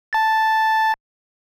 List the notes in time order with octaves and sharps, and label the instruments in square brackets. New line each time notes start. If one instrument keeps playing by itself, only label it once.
[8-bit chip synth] A5 A6